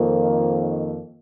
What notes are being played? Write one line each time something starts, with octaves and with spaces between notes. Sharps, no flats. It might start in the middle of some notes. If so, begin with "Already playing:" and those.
Already playing: F2 D#3 A#3